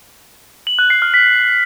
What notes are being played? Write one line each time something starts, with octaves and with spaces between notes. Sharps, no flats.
F#7
F#6
C7
F6
B6